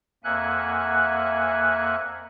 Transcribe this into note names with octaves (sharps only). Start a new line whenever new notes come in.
F2 A#3 E5 F#5 G#5 F#6